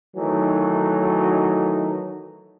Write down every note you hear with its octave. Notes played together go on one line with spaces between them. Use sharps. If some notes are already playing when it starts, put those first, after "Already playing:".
D#3 E3 F#3 A3 D#4